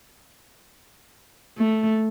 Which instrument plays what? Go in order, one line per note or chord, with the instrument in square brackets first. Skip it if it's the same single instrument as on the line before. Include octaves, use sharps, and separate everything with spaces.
[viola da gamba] A3